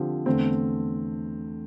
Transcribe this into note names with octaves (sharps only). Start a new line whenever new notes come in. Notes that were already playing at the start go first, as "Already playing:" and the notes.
Already playing: D3 F3 C4 G4
E2 D3 A3 C4